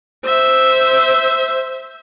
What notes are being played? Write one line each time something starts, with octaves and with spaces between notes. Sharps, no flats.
C5 E5